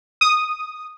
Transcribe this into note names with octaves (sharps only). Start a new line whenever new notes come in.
D#6